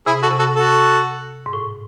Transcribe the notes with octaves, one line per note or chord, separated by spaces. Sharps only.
C3 E4 G#4
F#4 A4
C3
F#4 A4
F#4 A4
G#2
A2